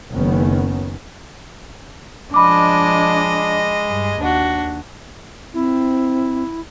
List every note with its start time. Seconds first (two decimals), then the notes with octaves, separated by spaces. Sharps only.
0.12 F#1 D#3 B3 C#4
2.34 F3 G#3 D4 D#5 B5 D6
3.88 G2
4.20 D#2 D4 F#4
5.54 C4 E4